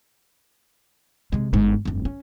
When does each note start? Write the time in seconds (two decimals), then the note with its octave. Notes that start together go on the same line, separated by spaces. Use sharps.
1.32 C3 G#3
1.53 G1 G#2
1.85 F1 G2
2.05 C#4